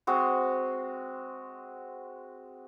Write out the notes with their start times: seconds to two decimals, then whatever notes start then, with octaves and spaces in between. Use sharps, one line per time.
0.07 G#3 C4 F#4